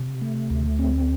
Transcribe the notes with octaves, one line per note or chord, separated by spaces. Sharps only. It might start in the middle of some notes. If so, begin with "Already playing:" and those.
Already playing: C3
A3
D2
C4